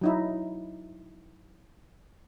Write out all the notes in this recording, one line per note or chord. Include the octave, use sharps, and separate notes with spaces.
F#3 D#4 E4